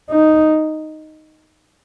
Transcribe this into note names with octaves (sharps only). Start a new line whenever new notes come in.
D#4